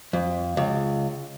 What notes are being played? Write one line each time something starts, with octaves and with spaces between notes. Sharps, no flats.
F2
C#2